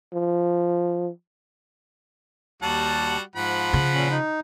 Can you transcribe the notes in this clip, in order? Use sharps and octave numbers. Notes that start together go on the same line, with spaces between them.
F3
D#2 G3 F#4 F#5 A5
G#2 F3 F#5 B5
C#3
A#2 C#4
D#4